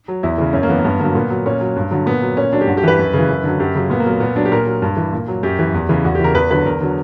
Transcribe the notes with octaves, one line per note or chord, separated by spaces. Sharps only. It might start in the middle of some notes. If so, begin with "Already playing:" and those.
F#3
E2 E4
C#3 E3
F#2 C#4
A#3
E3 B3
A#3
G2 B3
D3 F#3 A#3
A#2 B3
F#3
A#2 C#4
F#3
G2
D3 F#3
A#2 B3
F#3
A#2 C#4
F#3 D4
G4
G2 F#4
G4
E3 B4
F#2
C#3 E3
F#2
D3 F#3
F#2 G4
C#3 F#3
A#2 B3
A#3
F#3 B3
A#2 B3
F#3 D4
G4
A#2 A#4
F#3
G2
E3
A#2
F#3
F#2 G4
E3
E2
C#3 E3
E2 F#4
G4
C#3 E3 A#4
E2 B4
D3 F#3 B4
E2 A#4
D3 F#3